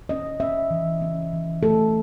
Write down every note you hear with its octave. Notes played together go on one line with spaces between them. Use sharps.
C#4 D#5
C#4 E5
E3
C#4
E3
A3 A4